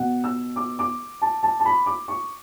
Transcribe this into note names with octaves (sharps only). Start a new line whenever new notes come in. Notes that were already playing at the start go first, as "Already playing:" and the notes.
Already playing: B2 F#5
E6
D6
D6
A5
A5
A5
B5
D6
C#6